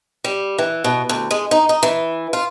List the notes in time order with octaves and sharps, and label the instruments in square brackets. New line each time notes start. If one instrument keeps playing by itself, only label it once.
[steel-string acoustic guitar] G3
E3
B2
D2
G#3
D#4
D#4
E3
F4